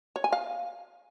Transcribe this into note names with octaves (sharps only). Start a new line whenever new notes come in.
C#5
G#5
F5